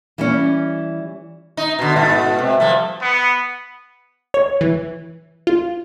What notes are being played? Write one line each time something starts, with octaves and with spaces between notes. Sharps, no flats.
E3 G3 C#4
D#4
B2 D3
G#2 B2 A3
C3
F3 G3 A3
B3
C#5
E3
F4